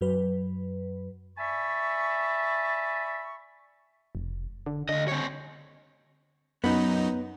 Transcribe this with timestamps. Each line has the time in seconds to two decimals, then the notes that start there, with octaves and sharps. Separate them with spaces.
0.01 F#2 F#3 B4
1.38 D5 E5 G#5 A5 B5 C#6
4.15 F1
4.66 D3
4.89 D2 D3 D#5
5.08 C4 C#5
6.64 F#2 B3 D#4